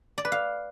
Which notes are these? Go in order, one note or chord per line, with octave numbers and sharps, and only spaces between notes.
D5
B4
F5